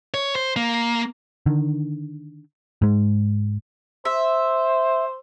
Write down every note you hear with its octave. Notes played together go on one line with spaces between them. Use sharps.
C#5
C5
A#3
D3 D#3
G#2 G#3
C5 E5